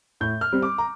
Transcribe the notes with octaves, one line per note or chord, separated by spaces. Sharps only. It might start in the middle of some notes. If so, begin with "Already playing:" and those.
A2 G6
F6
G3 C4
D6
A#5